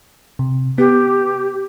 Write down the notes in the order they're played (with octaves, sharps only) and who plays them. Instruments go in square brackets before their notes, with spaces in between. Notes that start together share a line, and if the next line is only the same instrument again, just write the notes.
[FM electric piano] C3
[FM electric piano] B3 [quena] G4